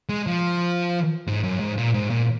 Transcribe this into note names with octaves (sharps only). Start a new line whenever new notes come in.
G#3
F3
G#2
F#2
G#2
A#2
G#2
A#2